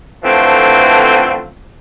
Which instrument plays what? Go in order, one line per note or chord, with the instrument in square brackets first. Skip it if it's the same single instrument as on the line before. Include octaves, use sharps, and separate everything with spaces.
[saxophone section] D3 E3 F3 A3 C4